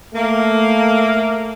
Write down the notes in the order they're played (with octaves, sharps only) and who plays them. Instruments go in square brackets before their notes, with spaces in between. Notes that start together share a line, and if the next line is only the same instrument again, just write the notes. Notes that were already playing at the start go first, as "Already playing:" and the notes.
[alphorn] A3 [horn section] A#3